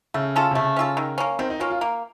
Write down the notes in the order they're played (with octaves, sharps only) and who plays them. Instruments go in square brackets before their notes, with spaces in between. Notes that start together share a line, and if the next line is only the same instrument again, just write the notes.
[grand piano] C#3 [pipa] A3
[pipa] C#4 F4 A4
[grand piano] C3
[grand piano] C#3 [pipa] A3
[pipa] C#4 F4 A4
D#3
A#3 C#4
[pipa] D#3 [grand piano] C4
[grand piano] D#4
[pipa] A#3 C#4 [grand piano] F4
[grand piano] F4
[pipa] A#3